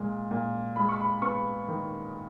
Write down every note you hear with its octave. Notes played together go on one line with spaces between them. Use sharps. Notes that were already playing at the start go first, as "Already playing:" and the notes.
Already playing: A#2 G#3
A#2
G#3 B5
C#6
B5
B3 C#6
D#3